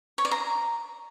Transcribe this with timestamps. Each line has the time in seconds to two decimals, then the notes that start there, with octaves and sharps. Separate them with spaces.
0.18 C#5
0.25 D5
0.31 A#5